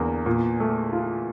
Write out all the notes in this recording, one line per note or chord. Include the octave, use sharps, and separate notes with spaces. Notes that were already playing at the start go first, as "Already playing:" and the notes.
Already playing: E2 D3 A#3
A#2
A3
F4